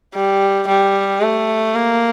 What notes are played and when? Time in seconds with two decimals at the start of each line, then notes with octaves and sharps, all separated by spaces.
0.14 G3
0.68 G3
1.21 A3
1.75 A#3